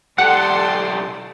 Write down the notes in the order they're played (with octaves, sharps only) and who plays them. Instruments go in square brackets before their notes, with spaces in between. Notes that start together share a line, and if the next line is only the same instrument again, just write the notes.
[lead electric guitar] B1 G4 [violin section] A4 D5 C6 [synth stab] F#5